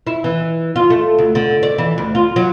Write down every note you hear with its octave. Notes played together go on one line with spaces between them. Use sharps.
E4
E3
F4
A3
D2
D3
D5
E3
D2
F4
F#3